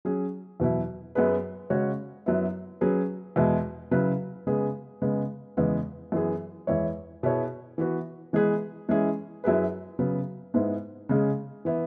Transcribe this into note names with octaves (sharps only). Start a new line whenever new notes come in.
F#3 C#4 G#4
E2 B2 F#3 E4
F#2 F#3 B3 G#4 B4
C#3 G#3 C#4 F#4 C#5
F#2 F#3 B3 E4
F#3 C#4 G#4 B4
E2 B2 G#3 E4
C#3 F#3 E4 B4
C#3 G#3 B3 G#4
C#3 G#3 B3
E2 C#3 G#3 B3
F#2 E3 B3 G#4
E2 E3 G#3 E4 C#5
B2 B3 E4 G#4 C#5
E3 B3 F#4
E3 G#3 B3 G#4 B4
E3 G#3 C#4 E4 G#4
F#2 F#3 E4 G#4 B4
C#3 F#3 B3
G#2 G#3 B3 E4
C#3 G#3 C#4 G#4
E3 B3 E4